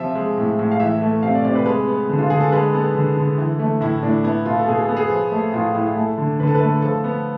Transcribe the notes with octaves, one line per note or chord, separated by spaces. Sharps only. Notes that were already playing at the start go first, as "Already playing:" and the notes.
Already playing: C3 F3 E5
G#3
A2
A2
F5
E3 E5
A3
C3 F5
D5
C3 D5
B4
G#3 B4
B3
D3
F4
D3 G#4
A4
G#3 B4
B3 A4
D3
D3
E3
A3
A2 E4
A2 D4
B3 E4
B2 F4
A4
B2 G#4
A4
B3
G#4
F3
A3
A2 F4
A2 E4
A3
D3
D3 B4
A4
B4
A3
F3 A4
B3